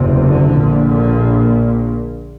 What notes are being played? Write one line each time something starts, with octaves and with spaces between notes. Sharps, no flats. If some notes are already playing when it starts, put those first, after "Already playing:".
Already playing: F#1 E2 C3
D3
A#1 A#2
D3